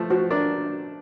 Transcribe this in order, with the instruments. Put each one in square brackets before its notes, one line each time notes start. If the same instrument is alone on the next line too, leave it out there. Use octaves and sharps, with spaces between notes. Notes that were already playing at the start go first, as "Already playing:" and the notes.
Already playing: [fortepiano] F3 A3
[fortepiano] F3 [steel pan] F#4
[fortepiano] D4 [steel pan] A#4